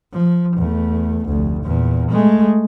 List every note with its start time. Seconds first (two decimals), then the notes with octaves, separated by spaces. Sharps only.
0.13 F3
0.57 E2 A3
1.26 F1 D2
1.63 E2 A#2
2.10 G#3 A3